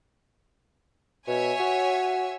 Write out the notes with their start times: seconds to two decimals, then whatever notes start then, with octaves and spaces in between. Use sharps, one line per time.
1.27 B2 C#5 E5 G#5
1.59 F#4